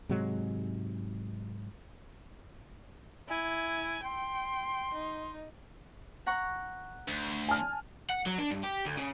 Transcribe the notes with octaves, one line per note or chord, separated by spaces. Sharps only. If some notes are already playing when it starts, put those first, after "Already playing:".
G#2 C3 F#3 G#3
E4 G#5
G5 C6
D#4
F#5 A#5 C#6
D2
G#5 A5 F6
F#5
F#3
D4
G2
G4
D2
C#3